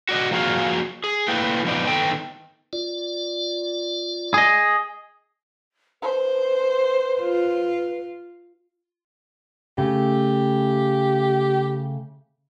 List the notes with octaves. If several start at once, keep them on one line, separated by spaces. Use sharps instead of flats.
F#4 D5 D#5
F3 A#3 F#4 G#4 F5
G#4
A3 A#3 E4 B4 G5
F3 B3 D#4 D5
D#3 B3 A4 G5
F4 D5
G#4 D#5
B4 C5
F4
C#3 A3 G4